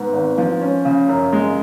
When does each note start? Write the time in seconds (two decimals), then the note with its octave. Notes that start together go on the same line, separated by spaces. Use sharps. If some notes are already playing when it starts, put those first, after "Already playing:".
Already playing: G#2 B3
0.13 G#1
0.38 F3
0.61 C#4
0.85 C#3
1.08 F#2
1.32 G#3